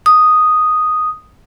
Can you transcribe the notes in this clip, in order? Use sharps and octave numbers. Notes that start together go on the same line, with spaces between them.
D#6